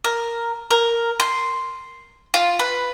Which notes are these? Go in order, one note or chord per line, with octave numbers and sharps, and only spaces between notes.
A#4
A#4
C6
F4
B4